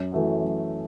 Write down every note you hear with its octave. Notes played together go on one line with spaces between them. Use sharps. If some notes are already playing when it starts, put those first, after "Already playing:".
Already playing: F#2
E3 A3 F#4
F#2